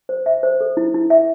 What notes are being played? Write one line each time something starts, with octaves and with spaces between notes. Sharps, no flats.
C5
E5
C5
A4
E4
E4
E5